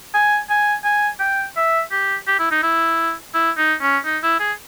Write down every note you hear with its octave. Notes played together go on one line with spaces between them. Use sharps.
G#5
G#5
G#5
G5
E5
G4
G4
E4
D#4
E4
E4
D#4
C#4
D#4
E4
G#4